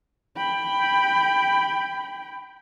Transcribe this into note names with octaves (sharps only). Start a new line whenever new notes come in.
G5 B5